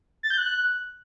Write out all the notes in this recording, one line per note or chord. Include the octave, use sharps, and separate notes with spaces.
A6
G6
F#6